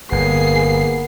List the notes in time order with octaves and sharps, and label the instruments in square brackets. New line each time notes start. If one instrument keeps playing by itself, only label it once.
[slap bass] G1 [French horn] A#3 [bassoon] B3 [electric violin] G#4 C7